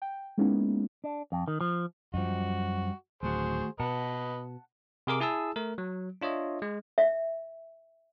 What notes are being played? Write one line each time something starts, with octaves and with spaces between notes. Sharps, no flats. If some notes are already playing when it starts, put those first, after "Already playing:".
G5
G#3 A#3 B3 C#4 D#4 E4
D4
F2
D#3
F3
F#2 F3 G3 F#4 D#5
D1 D#3 A3 F#4 G#4 C5
B2 B4 D#5 F#5 A5
C3 G#4 A#4 D6
E4 G#4 A5 E6
A3 A#4
F#3
D4 F4 C#5 D#5 E5
G#3
E5